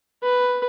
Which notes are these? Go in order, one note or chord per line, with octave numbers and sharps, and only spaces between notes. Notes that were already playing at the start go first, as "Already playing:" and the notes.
B4